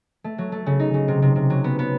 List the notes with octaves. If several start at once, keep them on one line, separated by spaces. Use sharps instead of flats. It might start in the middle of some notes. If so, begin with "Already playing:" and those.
A3
F#3
A3
C#3
D#4
C#3
C3
C3
C3
F#3
B3
B3